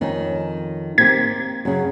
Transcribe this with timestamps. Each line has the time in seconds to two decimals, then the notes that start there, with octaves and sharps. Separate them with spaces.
0.01 F2 D#3 C#4
0.98 A#3 C4 G4 G#6 B6
1.65 F#2 C#3